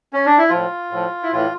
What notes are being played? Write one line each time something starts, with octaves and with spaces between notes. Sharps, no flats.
C#4
D4
E4
A2 F3 F4
A2 F3
E4
A2 E3 F4